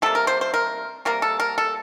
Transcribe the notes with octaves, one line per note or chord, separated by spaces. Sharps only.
C3 G3 A#3 A4
A#4
C5
C5
A#4
C3 G3 A#3 A#4
A4
A#4
A4